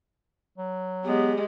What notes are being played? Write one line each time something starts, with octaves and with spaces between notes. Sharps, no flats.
F#3
G#3 B3 G4